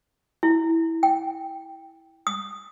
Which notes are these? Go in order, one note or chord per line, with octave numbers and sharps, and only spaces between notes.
E4
G5
D#6